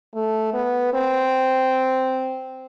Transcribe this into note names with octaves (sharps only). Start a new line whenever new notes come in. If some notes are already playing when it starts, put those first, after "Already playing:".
A3
B3
C4